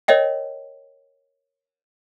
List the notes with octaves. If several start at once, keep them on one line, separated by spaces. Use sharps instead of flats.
A#4 C#5 D#5 E5 G5